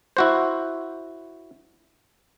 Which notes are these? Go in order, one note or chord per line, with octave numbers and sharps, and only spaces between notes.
E4 F#4 C5